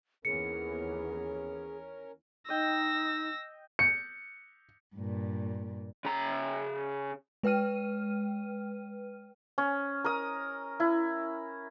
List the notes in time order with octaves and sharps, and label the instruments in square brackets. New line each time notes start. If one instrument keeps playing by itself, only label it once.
[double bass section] D#2 E3 B3 [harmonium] C#4 A#4 [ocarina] G#4 [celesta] C#7
[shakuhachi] D#4 [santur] D#5 G5 [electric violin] E6 A#6
[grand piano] C#7
[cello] G2 A#2
[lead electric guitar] C#3 A#5
[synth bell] G#3 B4 G5 F6 D#7
[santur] C#4
A#4 D#6
E4